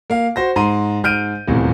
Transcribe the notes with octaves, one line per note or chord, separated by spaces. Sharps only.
A#3 F5
F#4 C5 A#6
G#2 A#5 C6 D#7
G#2 F6 G6 D7 D#7
D#1 E2 A2 C3